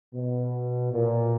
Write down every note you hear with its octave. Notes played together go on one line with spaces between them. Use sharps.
B2
A#2